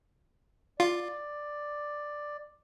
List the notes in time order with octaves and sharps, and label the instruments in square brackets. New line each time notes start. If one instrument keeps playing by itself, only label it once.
[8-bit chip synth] F4 [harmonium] D5